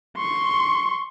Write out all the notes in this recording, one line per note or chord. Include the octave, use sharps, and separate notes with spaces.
C6 C#6